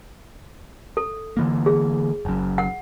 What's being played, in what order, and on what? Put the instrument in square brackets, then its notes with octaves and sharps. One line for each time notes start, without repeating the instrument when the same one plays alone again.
[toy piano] A4
[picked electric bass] D3 E3 A#3
[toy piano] G#4
[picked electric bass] F#1 F#2
[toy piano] F#5